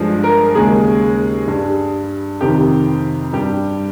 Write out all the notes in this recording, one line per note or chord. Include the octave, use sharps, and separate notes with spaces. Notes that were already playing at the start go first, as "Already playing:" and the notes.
Already playing: G2 F3 G#3
A#4
D#2 C#3 G#3 G#4
G2 G3
F2 C3 D#3 G4
G2 G3 G4